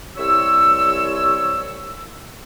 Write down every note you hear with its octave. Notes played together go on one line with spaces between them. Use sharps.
C2 C#5 E6